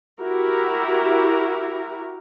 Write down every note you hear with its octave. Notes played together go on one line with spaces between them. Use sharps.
E4 F#4 G4 A#4